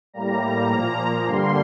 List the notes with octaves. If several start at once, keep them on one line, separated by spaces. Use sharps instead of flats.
A2 G3 A#3 A#5
A#2 F3 A#3
G2 D3 G3 A#3 C6